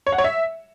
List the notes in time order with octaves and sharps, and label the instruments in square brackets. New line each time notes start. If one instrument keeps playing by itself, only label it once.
[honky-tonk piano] C#5
F#5
C#5
E5